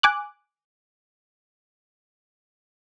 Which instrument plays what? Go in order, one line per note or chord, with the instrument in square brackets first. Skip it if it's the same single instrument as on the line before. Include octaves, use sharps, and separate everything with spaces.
[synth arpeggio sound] G#5 D6 F#6